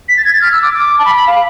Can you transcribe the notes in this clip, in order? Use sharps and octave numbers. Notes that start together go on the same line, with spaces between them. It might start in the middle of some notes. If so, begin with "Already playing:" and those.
B6
A6
G#6
A6
F6
E6
D6
D6
A5
B5
B5
F5